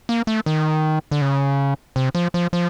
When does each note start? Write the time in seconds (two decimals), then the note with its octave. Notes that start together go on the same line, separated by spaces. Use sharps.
0.09 A#3
0.27 A3
0.46 D#3
1.11 D3
1.21 C#3
1.96 C3
2.15 F3
2.34 F3
2.53 F3